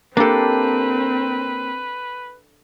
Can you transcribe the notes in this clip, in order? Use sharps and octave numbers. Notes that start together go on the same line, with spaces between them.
A#3 C4 D4 G4 A4 B4